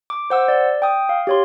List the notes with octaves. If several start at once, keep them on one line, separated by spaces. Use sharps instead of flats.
D6
C5 F#5 E6
D5
G5 D#6
F5
G4 C#5 C6